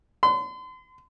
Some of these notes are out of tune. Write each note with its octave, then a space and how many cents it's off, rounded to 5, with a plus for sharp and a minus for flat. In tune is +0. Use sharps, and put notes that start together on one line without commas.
C6 -40